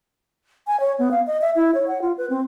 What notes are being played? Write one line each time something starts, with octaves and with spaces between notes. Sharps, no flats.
G#5
C#5
B3
F5
D#5
E5
E4
C#5
F#5
F4
B4
C4